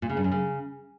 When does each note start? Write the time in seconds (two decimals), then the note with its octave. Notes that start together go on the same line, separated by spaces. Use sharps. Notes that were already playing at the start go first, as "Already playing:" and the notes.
0.02 A#2
0.10 C#3
0.17 G2
0.24 F#2
0.31 C#3